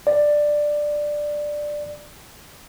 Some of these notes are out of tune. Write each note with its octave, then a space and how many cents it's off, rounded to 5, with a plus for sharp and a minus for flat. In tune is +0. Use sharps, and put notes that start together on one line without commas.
D5 +10